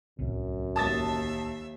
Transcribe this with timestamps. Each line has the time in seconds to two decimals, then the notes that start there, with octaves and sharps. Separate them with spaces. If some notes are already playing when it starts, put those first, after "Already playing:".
0.19 D1 C2 F#2
0.76 D#2 E5 A5 D#6 A6